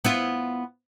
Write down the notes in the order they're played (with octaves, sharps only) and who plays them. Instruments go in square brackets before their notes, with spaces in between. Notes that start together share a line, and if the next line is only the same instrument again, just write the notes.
[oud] B3 E4 F4